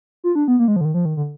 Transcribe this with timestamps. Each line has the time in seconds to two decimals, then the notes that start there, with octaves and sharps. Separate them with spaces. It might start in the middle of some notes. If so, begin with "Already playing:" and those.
0.24 F4
0.35 D4
0.48 B3
0.59 A#3
0.68 G#3
0.76 F3
0.81 D3
0.85 D#3
0.94 F3
1.05 D#3
1.17 D3